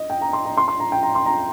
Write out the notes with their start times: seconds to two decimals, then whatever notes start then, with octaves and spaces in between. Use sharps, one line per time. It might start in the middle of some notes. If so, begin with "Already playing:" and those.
Already playing: D#5
0.10 G5
0.21 A#5
0.33 C6
0.45 A#5
0.57 C6
0.68 C6
0.80 A#5
0.92 G5
1.03 A#5
1.15 C6
1.26 A#5